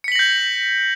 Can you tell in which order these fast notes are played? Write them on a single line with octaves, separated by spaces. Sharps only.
C#7 B6 F#7 A#6 G6